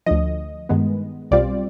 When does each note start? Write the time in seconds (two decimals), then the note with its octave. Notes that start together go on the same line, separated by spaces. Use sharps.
0.06 D2 D3 F3 D#5
0.69 G2 D#3 G#3 B3
1.31 B1 B2 G3 C4 F4 D5